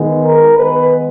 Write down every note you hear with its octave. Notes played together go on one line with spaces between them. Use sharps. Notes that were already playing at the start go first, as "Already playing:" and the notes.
Already playing: D#3 G#3 B3
A#4
D#3 G#3 B3 B4